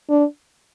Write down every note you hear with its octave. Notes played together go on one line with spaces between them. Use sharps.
D4